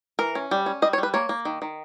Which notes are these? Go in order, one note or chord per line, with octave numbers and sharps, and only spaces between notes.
E3 A#4
C#4
G3
C#4
G3 D#5
C#5
G3
B4
A#3 C#5
A#3
D#3
D#3